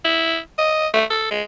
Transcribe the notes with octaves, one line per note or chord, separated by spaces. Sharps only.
E4
D#5
A3
A4
G#3